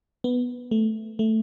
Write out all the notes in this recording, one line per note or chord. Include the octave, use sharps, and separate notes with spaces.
B3
A3
A3